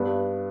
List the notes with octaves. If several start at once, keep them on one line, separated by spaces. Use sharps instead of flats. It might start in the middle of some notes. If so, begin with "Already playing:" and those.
Already playing: G2 B3